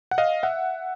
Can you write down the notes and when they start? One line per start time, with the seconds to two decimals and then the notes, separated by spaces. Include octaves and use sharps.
0.11 F#5
0.18 D#5 F5
0.43 E5 F#5